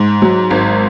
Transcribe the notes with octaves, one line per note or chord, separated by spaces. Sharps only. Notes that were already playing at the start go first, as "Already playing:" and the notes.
Already playing: G#2
F#3
G#1